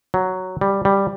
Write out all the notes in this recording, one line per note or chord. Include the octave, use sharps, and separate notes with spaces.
F#3
G3
G3